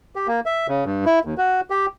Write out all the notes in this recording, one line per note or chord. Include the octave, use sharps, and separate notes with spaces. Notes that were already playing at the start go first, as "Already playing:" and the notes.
G4
A#3
E5
C#3
G2
E4
D#2
F#4
G4